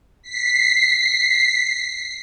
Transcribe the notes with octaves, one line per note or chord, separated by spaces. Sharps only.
B6 C7